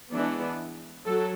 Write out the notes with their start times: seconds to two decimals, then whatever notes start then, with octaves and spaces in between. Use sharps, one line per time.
0.11 E3 G#3 B3 D4
1.05 F#3 A4